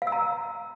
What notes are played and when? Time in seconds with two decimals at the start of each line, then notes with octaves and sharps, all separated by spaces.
0.02 F5
0.07 E6
0.12 A#5